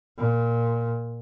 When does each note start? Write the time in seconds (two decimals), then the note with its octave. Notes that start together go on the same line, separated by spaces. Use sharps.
0.18 A#2